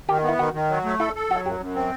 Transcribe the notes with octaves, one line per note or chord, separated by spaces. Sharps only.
D#3 G4
B3 E4
D#3 F#4
D#3
F#3
A3
E4 A4
A4
F#3 F#4
F#2 G4
F#2
C4